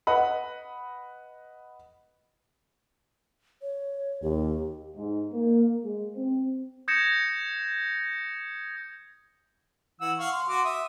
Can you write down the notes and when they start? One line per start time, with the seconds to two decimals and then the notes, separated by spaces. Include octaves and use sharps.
0.07 B4 D#5 F#5 B5
3.62 C#5
4.22 D#2 G4
4.97 G#2
5.32 A#3
5.84 G#3
6.15 C4
6.88 D#6 G6 G#6 A#6 C#7 E7
10.01 E3 F#5 E6
10.19 F5 F#5 C#6
10.32 C6
10.49 F#4 C6 D6
10.65 E5 D#6